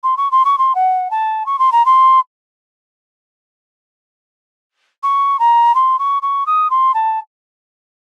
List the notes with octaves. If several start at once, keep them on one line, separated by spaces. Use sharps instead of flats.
C6
C#6
C6
C#6
C6
F#5
A5
C#6
C6
A#5
C6
C#6
A#5
C6
C#6
C#6
D#6
C6
A5